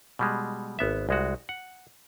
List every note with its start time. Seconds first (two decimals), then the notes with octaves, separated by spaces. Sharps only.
0.19 B2 G3 G#3
0.79 G#1 B3 E5
1.09 C2 G#3 F#4
1.49 F#5